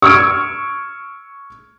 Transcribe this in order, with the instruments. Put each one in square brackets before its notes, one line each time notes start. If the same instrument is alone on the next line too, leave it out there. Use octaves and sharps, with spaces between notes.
[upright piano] C#6 E6 F6 G#6 D7